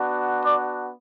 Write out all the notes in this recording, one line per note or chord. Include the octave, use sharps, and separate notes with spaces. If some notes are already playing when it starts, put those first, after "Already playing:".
Already playing: B3 D4 F#4
D5